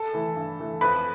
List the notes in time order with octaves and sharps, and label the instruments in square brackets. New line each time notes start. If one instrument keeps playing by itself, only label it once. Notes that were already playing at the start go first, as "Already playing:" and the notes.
Already playing: [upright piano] A4 A5
E3 A3
G2
E3 A3
F2 B4 B5